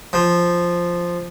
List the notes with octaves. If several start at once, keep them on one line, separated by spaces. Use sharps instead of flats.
F3